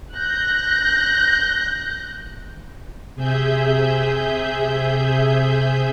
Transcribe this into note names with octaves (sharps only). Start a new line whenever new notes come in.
F#6 G6 A#6
C3 G#4 E5 G6